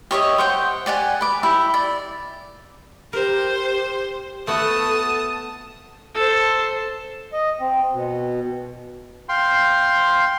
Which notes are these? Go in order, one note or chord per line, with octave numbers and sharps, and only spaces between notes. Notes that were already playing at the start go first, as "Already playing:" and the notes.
G4 C#5 D#5 E5
C5 F#5 G5
G4 D5 F#5 G#5
B4 D6
E4 G4 E5
D5
G4 A#4 C5
A3 B3 F#4 A4 A5 D#6
A4 C5
D#5
C4
B2
F5 G5 C6